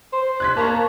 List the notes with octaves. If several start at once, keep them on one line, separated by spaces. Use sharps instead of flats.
C5
F#6 G#6 B6
A#3 A5 A#5 C#6